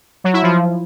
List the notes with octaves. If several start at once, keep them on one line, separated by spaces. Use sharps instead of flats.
F#3
E4
F3